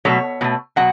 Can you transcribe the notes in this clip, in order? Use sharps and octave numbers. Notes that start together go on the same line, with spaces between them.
B2 F#3 A3 C#5
B2 F#3 A3
B2 F#3 F#5